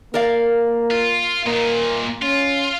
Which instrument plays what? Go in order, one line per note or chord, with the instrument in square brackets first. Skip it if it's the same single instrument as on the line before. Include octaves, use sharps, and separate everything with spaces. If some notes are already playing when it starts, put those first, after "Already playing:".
[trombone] A#3 [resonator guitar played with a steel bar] A#4 D5 F5
[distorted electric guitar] F4
[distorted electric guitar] A#2 D#4 [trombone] A#3
[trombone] C#4 [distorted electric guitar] F4